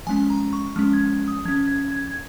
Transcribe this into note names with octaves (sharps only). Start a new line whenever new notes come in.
F3 G#3 C#4 G#5
A#5
C#6
F3 G#3 C#4 F6
G#6
D#6
F3 C#4 G#6
G#6
G#6
G#6